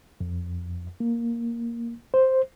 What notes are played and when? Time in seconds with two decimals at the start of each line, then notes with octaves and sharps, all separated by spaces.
0.21 F2
1.00 A#3
2.14 C5